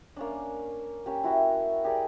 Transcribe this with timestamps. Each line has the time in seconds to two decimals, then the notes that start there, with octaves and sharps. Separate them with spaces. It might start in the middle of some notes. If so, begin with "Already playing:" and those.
0.16 A#3 C#4 D4
1.06 A#3 C#4 G4
1.24 E4 F#4 E5 G5
1.84 G4 G#4 A#4 D5